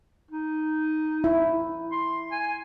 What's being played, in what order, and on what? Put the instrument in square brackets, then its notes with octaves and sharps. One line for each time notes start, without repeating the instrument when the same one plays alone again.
[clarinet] D#4
[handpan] E4
[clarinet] C6
G#5